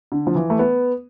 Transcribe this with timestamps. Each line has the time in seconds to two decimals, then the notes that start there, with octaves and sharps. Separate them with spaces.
0.12 D3
0.27 F3
0.35 E3
0.50 A3
0.59 B3